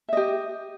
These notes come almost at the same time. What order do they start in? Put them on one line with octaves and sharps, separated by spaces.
E5 D#5 G4